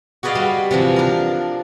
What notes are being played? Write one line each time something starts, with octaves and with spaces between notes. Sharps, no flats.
F#4 G#4 B4 D5 D#5 F5
G3
C3 E3 F3
D4 A#4